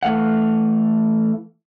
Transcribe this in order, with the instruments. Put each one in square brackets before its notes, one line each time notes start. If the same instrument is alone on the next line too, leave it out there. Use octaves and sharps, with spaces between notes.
[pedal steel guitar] E3 A3 F5 F#5